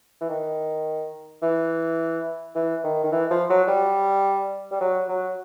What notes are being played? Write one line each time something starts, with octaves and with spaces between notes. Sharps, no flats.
E3
D#3
E3
E3
D#3
D#3
E3
F3
F#3
G3
G3
F#3
F#3